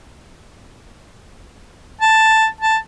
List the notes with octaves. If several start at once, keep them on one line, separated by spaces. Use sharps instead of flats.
A5
A5